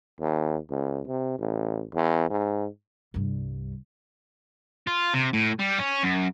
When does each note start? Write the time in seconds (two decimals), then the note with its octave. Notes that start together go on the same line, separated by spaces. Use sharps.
0.21 D#2
0.70 C#2
1.07 C3
1.38 A1
1.95 E2
2.30 G#2
3.14 C2 G2
4.87 F4
5.14 C3
5.33 A2
5.59 G3
5.78 C#4
6.03 F#2